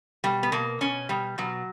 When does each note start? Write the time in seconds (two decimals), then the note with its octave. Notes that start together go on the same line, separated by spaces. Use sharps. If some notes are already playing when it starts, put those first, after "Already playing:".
0.24 B2 G3
0.43 B3
0.52 B2 A#3
0.81 B2 C#4
1.09 B2 G3
1.38 B2 F#3